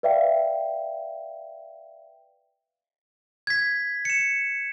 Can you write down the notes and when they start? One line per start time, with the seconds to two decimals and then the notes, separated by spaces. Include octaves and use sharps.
0.03 B4 D5 E5 F5 G5
3.47 G#6 B6
4.05 C#7 E7